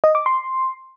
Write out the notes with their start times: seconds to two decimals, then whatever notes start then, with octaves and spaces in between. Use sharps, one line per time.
0.04 D#5
0.15 D6
0.26 C6